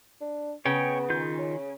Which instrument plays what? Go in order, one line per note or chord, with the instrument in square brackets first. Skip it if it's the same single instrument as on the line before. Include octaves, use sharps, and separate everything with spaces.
[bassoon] D4
[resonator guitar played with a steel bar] C#3 [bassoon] B3 [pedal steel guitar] C#5 G5 G#5
[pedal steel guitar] D#3 F4 G6
[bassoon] C#4